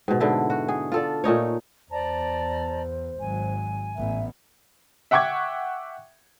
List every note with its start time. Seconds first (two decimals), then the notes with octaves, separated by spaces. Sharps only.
0.08 G#2 B2
0.20 G#2 D3 E4
0.50 F#4
0.68 G#4
0.92 F4 A4 D5
1.24 A#2 A3 D#4 C#5
1.91 E2 C5 D5 A5 A#5
3.19 G#1 F#3 G#5
3.96 A1 B3 E5
5.11 E5 F#5 G5 C#6 D6 G#6